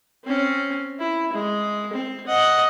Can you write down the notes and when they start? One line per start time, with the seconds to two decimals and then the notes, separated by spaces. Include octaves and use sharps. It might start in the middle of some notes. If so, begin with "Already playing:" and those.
0.24 C4 C#4
0.99 E4
1.33 G#3
1.93 C4
2.27 D#5 F#5